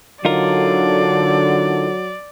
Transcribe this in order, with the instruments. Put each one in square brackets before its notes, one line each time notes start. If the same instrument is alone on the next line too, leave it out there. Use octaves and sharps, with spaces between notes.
[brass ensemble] D3 [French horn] F#3 [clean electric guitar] D#4 F4 A#4 [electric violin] D5